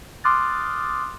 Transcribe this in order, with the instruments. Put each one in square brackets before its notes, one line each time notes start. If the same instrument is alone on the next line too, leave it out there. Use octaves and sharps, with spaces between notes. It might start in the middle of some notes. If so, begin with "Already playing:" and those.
[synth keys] C6 D6 D#6 F6 F#6 A6